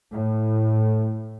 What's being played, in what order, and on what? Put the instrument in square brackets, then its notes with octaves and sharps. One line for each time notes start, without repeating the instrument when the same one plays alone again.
[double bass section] A2